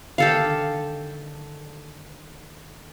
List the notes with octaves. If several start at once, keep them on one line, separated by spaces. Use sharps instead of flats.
D3 D#3 G4 A4 F5